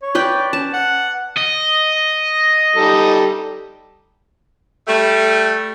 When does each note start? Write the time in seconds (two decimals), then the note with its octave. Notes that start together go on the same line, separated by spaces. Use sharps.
0.02 C#5
0.15 B4 D5 G5
0.53 C#4 A5
0.73 F#5
1.38 D#5
2.76 G3 D#4 A4
4.87 G3 A3